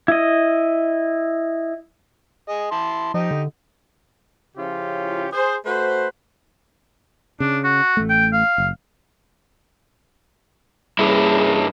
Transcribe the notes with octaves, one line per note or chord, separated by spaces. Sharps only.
E4 D#5
G#4 D#5
E4 A5 C6
F3 D#4 G4 D#5
D3
C#3 F3 C#4 E4 F4 G4
G#4 C5
A3 F#4 B4 C5
C#3 D4
F#4
A1 A3
G5
F5
F#1
G2 C#4 E4 G#4